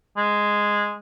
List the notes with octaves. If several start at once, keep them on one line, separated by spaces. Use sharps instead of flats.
G#3